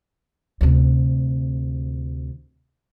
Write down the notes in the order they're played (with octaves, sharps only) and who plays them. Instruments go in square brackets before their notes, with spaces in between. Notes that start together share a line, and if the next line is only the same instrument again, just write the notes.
[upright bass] D2 C3